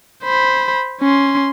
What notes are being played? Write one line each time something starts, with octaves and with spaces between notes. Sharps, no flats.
C5 B5
C#4 C6